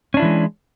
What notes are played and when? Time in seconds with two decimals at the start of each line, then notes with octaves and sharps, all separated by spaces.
0.14 C#4
0.17 D4
0.20 E4
0.22 E3
0.25 G#3